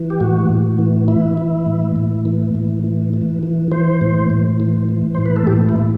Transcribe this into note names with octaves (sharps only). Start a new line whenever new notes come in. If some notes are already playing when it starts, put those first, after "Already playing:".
Already playing: E3
G4
A2 F#4
A2
E3
E3 E4
E3
A2
A2
E3
A2
E3
E3
E3
E3 C5
A2
A2
E3
E3
A2 C5
B4
A4
A2 G4
E4
A2